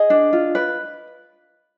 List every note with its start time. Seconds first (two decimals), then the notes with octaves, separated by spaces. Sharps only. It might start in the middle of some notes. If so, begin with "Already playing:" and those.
Already playing: G#4 D#5
0.10 D4
0.33 F4
0.55 B4